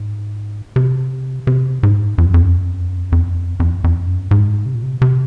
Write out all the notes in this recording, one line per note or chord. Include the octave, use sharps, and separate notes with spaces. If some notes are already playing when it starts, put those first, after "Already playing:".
Already playing: G#2
C3
C3
G#2
F2
F#2
F2
F#2
F2
F#2
F2
F#2
F2
F#2
F2
F#2
F2
F2
F2
F#2
G#2
C3
A#2
C3
C3